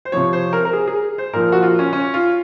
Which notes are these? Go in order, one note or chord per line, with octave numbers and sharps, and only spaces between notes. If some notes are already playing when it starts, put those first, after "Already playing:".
C5
C3 F3 C#5
C5
A#4
A#4
G#4
G#4
C5
A#2 F3 A#4
F#4
F4
C#4
C#4
F4